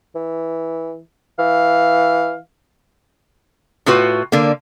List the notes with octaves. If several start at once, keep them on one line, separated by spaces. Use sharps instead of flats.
E3
E3 F5
A2 F4 F#4 B4
D3 A#3